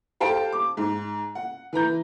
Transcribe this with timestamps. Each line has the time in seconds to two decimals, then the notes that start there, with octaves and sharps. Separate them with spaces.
0.20 G4 A4 C5 F5 G5 A5
0.53 D6
0.77 G#2
1.35 F#5
1.73 E3 B4 A#5 G6